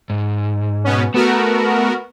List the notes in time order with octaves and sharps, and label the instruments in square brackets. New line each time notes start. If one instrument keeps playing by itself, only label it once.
[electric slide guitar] G#2
[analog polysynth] B2 B3 C#4
[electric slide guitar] A3 [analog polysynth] B3 F#4 A#4